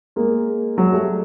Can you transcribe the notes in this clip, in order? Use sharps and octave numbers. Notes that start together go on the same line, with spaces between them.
G#3 A#3
F#3 G#3
G3 A3